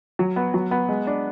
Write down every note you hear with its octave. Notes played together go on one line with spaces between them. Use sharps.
F#3
B3
F#3
B3
G#3
D4